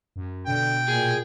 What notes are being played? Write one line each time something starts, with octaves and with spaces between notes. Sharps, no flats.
F#2
B2 D3 G5
A#2 G#4